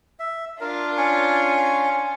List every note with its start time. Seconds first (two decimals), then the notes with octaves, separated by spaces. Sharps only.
0.20 E5
0.60 D4 F4 A#4
0.97 C#4 G#5 C#6